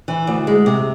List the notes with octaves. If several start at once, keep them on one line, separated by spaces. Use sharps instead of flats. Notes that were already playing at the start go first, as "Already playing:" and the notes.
E3
D2
G#3
C3